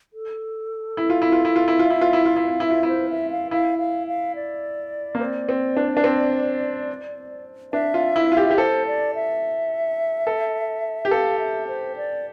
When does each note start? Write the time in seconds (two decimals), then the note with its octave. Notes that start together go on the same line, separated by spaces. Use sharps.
0.13 A4
0.97 E4
1.10 F4
1.22 E4
1.32 F4
1.45 E4
1.56 F4
1.68 E4
1.79 F4 E5
1.90 E4
2.01 F4
2.13 E4
2.25 F4 F5
2.36 E4
2.48 F4
2.60 E4
2.66 F4 E5
2.83 E4 C5
3.10 E5
3.31 F5
3.51 E4 F5
3.79 F5
4.08 F5
4.35 D5
5.15 A#3
5.20 C4 D5
5.49 C4
5.77 D4
5.97 D4
6.04 C4
7.73 D4 E5
7.94 F4
8.16 E4
8.32 F4
8.37 G4
8.51 G4
8.57 A4 C5
8.86 D5
9.15 E5
10.27 A4
11.05 G4
11.11 A4 F5
11.39 E5
11.67 C5
11.96 D5